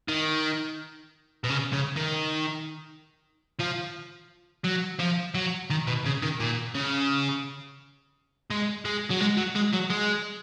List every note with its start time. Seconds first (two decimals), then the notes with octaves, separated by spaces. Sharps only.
0.09 D#3
1.44 B2
1.49 C#3
1.73 C#3
1.96 D#3
3.59 F3
4.65 F#3
5.00 F3
5.35 F#3
5.70 D#3
5.87 B2
6.05 C#3
6.22 D#3
6.40 A#2
6.74 C#3
8.50 G#3
8.85 G#3
9.10 F#3
9.21 G#3
9.37 F#3
9.56 G#3
9.73 F#3
9.90 G#3